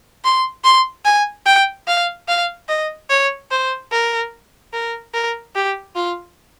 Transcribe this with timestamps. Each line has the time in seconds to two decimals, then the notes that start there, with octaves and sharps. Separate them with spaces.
0.24 C6
0.64 C6
1.05 G#5
1.46 G5
1.88 F5
2.28 F5
2.69 D#5
3.10 C#5
3.51 C5
3.92 A#4
4.73 A#4
5.14 A#4
5.55 G4
5.95 F4